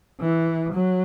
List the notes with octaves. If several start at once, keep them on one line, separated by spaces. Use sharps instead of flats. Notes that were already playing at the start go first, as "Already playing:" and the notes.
E3
F#3